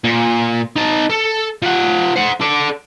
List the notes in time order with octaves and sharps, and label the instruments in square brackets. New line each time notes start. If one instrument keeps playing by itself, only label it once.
[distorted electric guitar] A#2
D#4 A5
A4
F3 F#5
C5 F#5
A4 D5